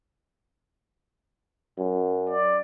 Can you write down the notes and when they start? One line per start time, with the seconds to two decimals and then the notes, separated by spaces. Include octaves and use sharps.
1.78 F#2
2.29 D5